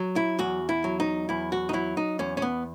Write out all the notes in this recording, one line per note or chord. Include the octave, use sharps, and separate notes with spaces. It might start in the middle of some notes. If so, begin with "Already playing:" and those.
Already playing: F#3
E4
E2 F#4
E4
F#3
D#4
E2 E4
F#4
D#4
F#3 E4
D#4
E2 C#4
C#4
B3